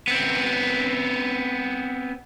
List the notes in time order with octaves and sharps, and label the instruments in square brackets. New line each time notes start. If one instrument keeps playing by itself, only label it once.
[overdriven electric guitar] B3 C4